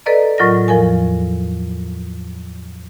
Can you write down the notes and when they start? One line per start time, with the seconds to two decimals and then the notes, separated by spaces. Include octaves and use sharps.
0.06 A4 B4 D5 D#5 A#5
0.38 A2 F#3 F4 A#4 D#5 A#6
0.68 E2 F3 A#4 G#5